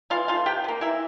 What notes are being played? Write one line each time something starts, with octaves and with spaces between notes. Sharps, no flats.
E3 F4 F5
A3 F4 F5
C3 G4 G5
F3
A#3
E3 E4 E5